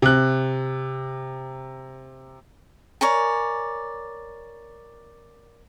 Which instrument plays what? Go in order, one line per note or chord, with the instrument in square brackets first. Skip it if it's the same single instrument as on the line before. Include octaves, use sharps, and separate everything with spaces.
[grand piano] C3 F#6
[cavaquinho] A#4 C#5 D5 G#5